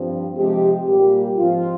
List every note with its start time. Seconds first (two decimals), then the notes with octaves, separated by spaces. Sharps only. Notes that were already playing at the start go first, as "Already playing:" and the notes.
Already playing: G2 F3 C4
0.37 C3 F3 G#3 G4
0.87 A#2 G3 A#3 G4
1.37 G#2 F3 C4 F4